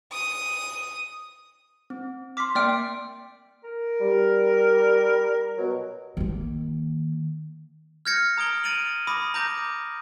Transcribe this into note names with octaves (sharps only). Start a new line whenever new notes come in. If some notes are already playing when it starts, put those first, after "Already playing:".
D#6 D#7
C4
C6 D6 F6 B6
A#3 D5 G5 F6 D7
A#4
G3
B2 F#3
D#3 A#3
F6 G6 G#6 A#6 C#7
A#5 D#6 D7 G7
A6 D7 D#7 F7 F#7
B5 D6 D#6 A#6
A#5 D6 G6 A#6
D6